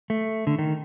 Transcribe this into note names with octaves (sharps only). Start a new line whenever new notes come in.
A3
D3
D#3